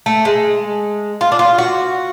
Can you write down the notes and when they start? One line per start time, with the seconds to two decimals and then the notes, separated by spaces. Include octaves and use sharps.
0.06 A3
0.25 G#3
1.21 F4
1.32 D4
1.39 F4
1.58 F#4